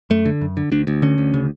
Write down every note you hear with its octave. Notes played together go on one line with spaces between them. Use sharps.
F#2 A3
D3
F#2
D3
D2 D4
D2
D3 C#4
D2
C#3